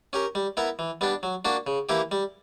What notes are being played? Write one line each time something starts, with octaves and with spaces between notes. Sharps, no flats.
C#4 G4 A#4
G3
B3 E4 A#4
E3
G3 B3 D4
F#3
A#3 D4 F#4
C#3
E3 A#3 E4 G4
G3